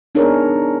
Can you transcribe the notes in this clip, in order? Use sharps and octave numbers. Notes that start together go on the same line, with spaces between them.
B3 D4 D#4 G#4 A#4 C#5